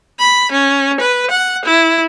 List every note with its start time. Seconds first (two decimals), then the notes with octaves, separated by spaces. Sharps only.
0.19 B5
0.52 C#4
1.00 B4
1.31 F#5
1.65 E4